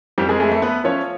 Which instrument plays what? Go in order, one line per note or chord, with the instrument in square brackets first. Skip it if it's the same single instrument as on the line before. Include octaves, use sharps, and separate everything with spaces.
[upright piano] F2 G3 G4
G#3 G#4
G#3 A3 G#4
A3 A4
A3 B3 B4
F3 C#4 C#5